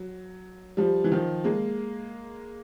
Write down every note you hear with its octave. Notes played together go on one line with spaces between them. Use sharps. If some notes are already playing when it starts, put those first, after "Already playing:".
Already playing: F#3
F3 G3
E3
D#3 F3
G#3 A#3